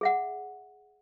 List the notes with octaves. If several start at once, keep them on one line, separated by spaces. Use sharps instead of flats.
G#4 E5 F#5